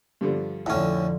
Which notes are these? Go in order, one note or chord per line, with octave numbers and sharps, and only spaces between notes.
G2 D3 F3
F2 A2 D3 C#4 F#5